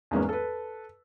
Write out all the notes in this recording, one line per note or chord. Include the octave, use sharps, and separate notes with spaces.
E2 G#2 G#3 A#3 B3 C#4
A4 B4